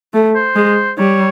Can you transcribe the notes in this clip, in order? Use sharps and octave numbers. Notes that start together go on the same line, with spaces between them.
A3
C5
G#3
G3 C#5